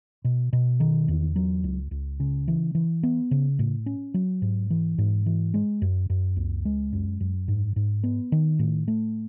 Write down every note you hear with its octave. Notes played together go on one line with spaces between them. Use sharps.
B2
B2
D#3
E2
F#3
C#2
C#2
C#3
E3
E3
B3
C#3
A2
C#4
F#3
G#2
E3
G#2
E3
G#3
F#2
F#2
C#2
G#3
F#2
F#2
G#2
G#2
B3
D#3
A2
A3